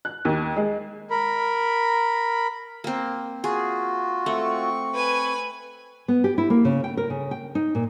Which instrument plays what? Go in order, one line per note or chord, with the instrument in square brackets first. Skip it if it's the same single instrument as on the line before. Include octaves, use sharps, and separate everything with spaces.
[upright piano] F#6
D#2
G#3
[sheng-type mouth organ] A#4 B5
[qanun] A#3 C4
[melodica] F4 F#4 [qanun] G#4
[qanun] A3 [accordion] C4 C#6
[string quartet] B4 G#5
[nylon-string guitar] B3
G4
E4
A#3
C#3
G5
A#4
C#3
G5
D#4
A#2